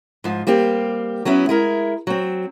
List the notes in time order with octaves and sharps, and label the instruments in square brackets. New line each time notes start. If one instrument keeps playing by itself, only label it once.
[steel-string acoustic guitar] G#2 F3
G3 A#3 C4 G4
F#3 B3 C#4 E4
G#3 E4 A#4
F#3 C4